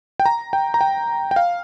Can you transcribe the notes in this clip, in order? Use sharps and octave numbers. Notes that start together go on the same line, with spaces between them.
G5
A#5
G5
A#5
G5
G5
F5